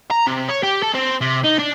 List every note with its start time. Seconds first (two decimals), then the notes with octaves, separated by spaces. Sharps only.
0.11 A#5
0.27 C3
0.48 C#5
0.63 G4
0.83 A4
0.94 C4
1.21 C3
1.44 D#4
1.58 D4